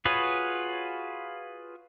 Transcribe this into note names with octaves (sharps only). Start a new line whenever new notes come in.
F4 F#4 G#4 B4 C#5